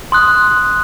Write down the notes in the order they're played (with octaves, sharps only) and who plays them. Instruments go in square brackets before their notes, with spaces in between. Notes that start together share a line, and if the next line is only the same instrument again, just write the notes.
[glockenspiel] C6 D#6 F#6